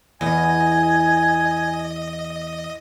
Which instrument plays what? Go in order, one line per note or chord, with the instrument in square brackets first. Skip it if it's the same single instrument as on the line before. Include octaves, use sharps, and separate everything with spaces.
[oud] E2 [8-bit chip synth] D#5 [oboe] G#5